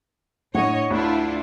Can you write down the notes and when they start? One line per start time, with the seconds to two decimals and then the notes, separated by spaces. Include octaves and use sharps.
0.55 A2 D3 C#5 D#5 F#5
0.91 D2 D4 E4 F4